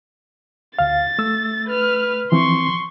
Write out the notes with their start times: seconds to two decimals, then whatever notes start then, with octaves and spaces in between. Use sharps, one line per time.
0.79 D2 F5 A6
1.19 A3 E6
1.67 B4 F6
2.32 E3 F3 C4 C6 C#6